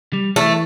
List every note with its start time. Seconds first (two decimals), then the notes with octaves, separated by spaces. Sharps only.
0.13 G3
0.36 E3 A3